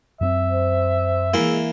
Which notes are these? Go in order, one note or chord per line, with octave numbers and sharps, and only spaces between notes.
F#2 B3 C4 E5
C5
E3 G#3 A#3